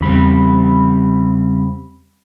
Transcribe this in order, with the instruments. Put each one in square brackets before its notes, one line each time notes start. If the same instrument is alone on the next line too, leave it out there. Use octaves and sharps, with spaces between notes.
[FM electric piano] E2 B5 [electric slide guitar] C#3 G3 C4